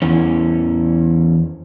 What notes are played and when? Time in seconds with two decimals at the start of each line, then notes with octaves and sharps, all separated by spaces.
0.02 E2 E3 C#4